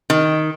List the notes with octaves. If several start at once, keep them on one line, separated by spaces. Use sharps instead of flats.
D#3